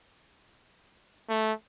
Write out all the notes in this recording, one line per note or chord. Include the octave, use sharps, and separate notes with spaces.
A3